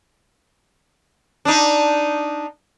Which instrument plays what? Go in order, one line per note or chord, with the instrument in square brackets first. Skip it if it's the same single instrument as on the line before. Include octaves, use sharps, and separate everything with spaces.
[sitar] D4 D#4